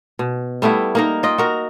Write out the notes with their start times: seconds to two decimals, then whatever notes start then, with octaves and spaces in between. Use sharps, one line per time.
0.19 B2
0.62 G3 A3 B3 E4
0.95 A#3 D#4 A#4
1.23 F4 D#5 G5
1.38 F#4 A#4